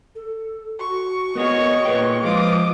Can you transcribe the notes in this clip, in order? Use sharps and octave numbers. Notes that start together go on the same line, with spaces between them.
A4
F#4 C#6
B3 F#4 G#4 A#4 C#5 D#5
A#2 G#4 B4 G5
F3 G#3 F4 D6 D#6